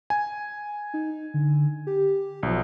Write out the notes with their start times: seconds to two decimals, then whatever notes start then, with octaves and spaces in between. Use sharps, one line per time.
0.10 G#5
0.94 D#4
1.34 D3
1.87 G4
2.43 B1 F3